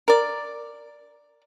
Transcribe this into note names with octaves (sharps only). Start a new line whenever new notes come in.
A#4 D5